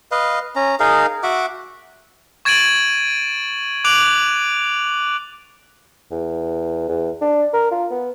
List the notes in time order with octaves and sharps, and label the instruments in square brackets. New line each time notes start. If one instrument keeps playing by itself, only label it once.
[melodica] B4 D#5 F5
C#4 A#5
D#4 G#4 A#4 F5
F#4 E5 F#5 D6
[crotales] C#6 G#6 A6 D7 D#7 F#7
D6 F#6 D7 F7 F#7
[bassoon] E2
E2
D4
A#4
F4
B3